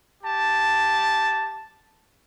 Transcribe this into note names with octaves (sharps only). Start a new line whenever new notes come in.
G4 A5